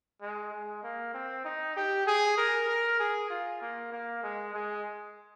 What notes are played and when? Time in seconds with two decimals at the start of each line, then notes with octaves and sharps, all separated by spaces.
0.22 G#3
0.52 G#3
0.83 A#3
1.14 C4
1.45 D#4
1.76 G4
2.07 G#4
2.38 A#4
2.69 A#4
2.99 G#4
3.30 F4
3.61 A#3
3.92 A#3
4.23 G#3
4.54 G#3